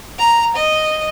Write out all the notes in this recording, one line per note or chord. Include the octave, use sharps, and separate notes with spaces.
A#5
D#5